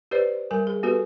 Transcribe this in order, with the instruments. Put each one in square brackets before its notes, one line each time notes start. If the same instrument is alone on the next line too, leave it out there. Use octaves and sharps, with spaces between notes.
[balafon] G4 B4 C5 D5
G3 A#4 G#5
G#4
B3 F#4 G4 A4 B4